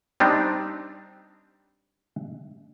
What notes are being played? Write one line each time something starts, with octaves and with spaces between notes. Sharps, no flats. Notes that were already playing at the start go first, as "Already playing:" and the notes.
G3 C4 D4 D#4